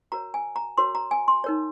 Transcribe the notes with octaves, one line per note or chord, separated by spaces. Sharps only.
F#4 A#4 C#5 A#5
G#5
A#5
F#4 A#4 C#5 C6
A#5
G#5
C6
D#4 A#4 C#5